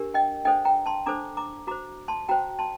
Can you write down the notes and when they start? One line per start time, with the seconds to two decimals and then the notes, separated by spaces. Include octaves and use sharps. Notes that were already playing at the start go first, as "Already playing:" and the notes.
Already playing: D4 G4 A#4
0.14 D#5 G5
0.45 D4 A4 C5 D#5 G5
0.65 G5 A#5
0.86 A5 C6
1.06 D4 A4 C5 A#5 D6
1.37 A#5 D6
1.67 F#4 A#5 D6
1.71 C5
2.08 A5 C6
2.29 F#4 C5 G5 A#5
2.59 A5 C6